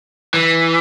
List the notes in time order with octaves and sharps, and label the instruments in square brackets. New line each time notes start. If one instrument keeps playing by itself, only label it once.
[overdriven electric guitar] E3